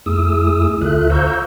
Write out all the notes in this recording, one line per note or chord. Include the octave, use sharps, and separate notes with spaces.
F2 A3 E4 G#4 D#6 E6
D2 D3 F4 A4 E5 F#6
C5 F5 A#5 C#6 E6 G6